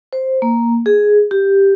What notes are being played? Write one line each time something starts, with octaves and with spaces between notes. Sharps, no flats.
C5
A#3
G#4
G4